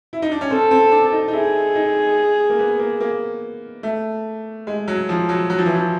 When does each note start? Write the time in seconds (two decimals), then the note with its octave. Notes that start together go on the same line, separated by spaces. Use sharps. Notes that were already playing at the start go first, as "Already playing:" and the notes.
0.13 E4
0.22 D#4
0.32 D4
0.41 C#4
0.50 C4 A4
0.71 C4
0.91 D4
1.12 D#4
1.28 D#4
1.33 E4 G#4
1.75 D#4
2.50 A#3
2.59 B3
2.79 A#3
3.01 A#3
3.83 A3
4.67 G#3
4.88 F#3
5.09 F3
5.29 F#3
5.50 F#3
5.58 F3
5.66 E3
5.75 F3